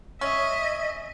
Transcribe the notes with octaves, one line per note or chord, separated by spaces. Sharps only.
C#4 D#5 E5